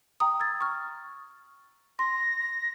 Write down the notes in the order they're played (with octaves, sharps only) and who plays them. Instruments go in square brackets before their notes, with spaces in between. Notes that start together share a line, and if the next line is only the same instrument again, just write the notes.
[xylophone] G5 A#5 D#6
E6 G#6 A6
C#6 F6
[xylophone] C6 [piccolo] A#6